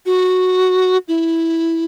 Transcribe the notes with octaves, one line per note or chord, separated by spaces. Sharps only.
F#4
E4